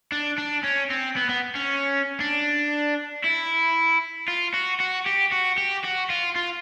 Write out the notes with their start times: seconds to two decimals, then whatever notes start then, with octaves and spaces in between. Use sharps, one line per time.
0.12 D4
0.38 D4
0.64 C#4
0.90 C4
1.16 B3
1.29 B3
1.55 C#4
2.20 D4
3.24 E4
4.28 F4
4.54 F#4
4.80 F#4
5.06 G4
5.32 F#4
5.58 G4
5.84 F#4
6.10 F4
6.36 F4